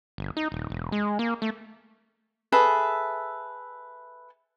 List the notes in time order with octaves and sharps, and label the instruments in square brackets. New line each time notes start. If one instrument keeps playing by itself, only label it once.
[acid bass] G1
D#4
D#1
E1
G#3
A#3
A3
[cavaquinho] G#4 A4 B4 E5